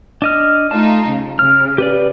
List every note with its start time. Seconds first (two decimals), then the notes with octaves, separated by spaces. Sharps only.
0.22 D4 D#5 F6
0.71 A3 D#4 F4 A5
1.06 C#3
1.39 C#3 F6
1.78 G4 B4 D5